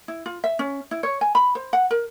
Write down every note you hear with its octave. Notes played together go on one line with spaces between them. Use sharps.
E4
F4
E5
C#4
E4
C#5
G#5
B5
C5
F#5
A#4